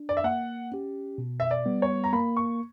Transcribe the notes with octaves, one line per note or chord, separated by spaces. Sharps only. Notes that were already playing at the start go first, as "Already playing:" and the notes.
Already playing: D4
D5
E5
A#3 F#5
C#4 G4
B2
E5
D5
G3 B3
C#5
A#5
A#3 B5
C#6